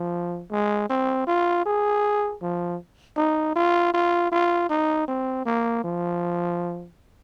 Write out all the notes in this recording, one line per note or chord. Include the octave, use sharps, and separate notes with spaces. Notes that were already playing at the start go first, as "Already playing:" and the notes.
Already playing: F3
G#3
C4
F4
G#4
F3
D#4
F4
F4
F4
D#4
C4
A#3
F3